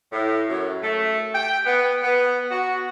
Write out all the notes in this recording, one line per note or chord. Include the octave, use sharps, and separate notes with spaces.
A2
F#2
A3
G5
B3
B3
F#4